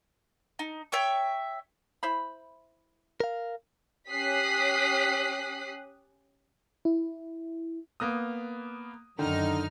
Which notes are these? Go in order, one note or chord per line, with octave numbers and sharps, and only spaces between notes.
D#4
C#5 E5 G5 C#6
E4 C5 B5
A#4 F5
C#4 G4 D#6 F#6 B6 C7
E4
A#3 B3 D#6
F#2 D3 D#3 D#4 F6